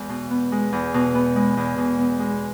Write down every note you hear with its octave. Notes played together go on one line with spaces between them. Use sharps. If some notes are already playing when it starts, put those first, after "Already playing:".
Already playing: E2 G#3
B2
B3
G#3
E2
B2
B3
G#3
E2
B2
B3
G#3